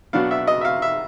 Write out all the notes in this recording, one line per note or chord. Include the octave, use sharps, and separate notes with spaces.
B2 F#3 B3 D4 F5
E5
D#5
E5
F5
E5